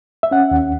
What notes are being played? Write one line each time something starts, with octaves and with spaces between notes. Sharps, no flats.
E5
C#4 F#5
D#2